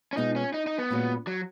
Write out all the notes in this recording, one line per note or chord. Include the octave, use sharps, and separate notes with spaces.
C#4
B2 G#3 B3 D#4 F4 G#4
C#4
D#4
D#4
B3
A#2 G#3 C#4 F#4
F#3